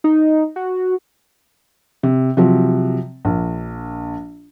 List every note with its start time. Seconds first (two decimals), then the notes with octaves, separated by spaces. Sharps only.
0.04 D#4
0.56 F#4
2.03 C3
2.37 C3 F3 F#3
3.25 A#1